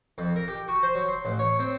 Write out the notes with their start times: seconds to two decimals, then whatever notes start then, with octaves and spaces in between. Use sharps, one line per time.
0.18 F2
0.36 A#4
0.48 G4
0.68 F#4
0.83 C5
0.95 F#3
1.09 C6
1.25 A1
1.39 C#5
1.59 C4